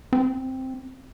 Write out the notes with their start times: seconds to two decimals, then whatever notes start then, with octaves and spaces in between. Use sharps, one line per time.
0.13 C4